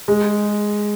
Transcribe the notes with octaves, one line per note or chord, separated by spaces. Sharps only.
G#3